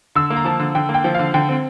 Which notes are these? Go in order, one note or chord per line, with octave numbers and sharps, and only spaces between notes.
D3 E6
A#3
A#5
F3 A5
D3
D3 G5
A#3
G5
F3
D3 F5
D3 G5
C4